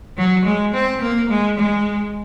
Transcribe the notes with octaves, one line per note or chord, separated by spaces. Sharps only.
F#3
G#3
C4
A#3
G#3
G#3